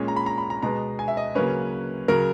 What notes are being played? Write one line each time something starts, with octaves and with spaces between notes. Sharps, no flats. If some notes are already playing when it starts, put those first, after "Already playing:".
Already playing: A#2 G#3 C#4
A#5
B5
A#5
B5
A#5
B2 G#3 B3 A#5
G#5
E5
D#5
C#3 F#3 A#3 C#4 B4
C#3 F#3 A#4